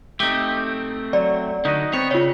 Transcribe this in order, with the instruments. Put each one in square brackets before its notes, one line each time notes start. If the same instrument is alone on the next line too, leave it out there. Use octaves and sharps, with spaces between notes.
[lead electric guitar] A3 C4 [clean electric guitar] D#4 G4
[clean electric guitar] F#3 [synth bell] D5
[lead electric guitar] D3 [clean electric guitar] D#4 F#4 D#5
[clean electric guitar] B3 C4 [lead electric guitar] C#5
[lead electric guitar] C#3 [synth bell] F4 C#5